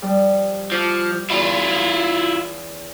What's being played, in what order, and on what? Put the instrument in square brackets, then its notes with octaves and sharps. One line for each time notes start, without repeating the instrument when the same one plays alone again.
[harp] F3 G3
[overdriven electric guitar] F3 [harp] E4 D6
[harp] E2 [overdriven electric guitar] E4 F4